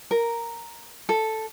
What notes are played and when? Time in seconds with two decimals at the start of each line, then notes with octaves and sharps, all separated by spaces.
0.11 A#4
1.09 A4